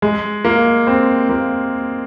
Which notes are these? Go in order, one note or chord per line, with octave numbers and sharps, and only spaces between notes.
G#3
A#3
C4
A#3